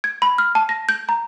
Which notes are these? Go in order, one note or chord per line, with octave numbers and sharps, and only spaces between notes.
G#6
B5
F6
A5
A#6
G6
A#5